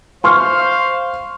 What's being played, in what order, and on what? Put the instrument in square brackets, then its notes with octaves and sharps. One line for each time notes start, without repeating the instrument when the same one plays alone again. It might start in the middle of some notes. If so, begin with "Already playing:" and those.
[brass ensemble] C5 F5 [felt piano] C6 C#6 F6